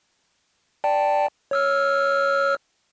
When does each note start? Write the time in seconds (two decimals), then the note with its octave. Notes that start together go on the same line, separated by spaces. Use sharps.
0.84 D5 G5 A5
1.51 C#5 E6 F6